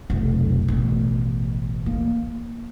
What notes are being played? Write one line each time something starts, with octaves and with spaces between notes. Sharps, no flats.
F1 B1
A1 B2
A#3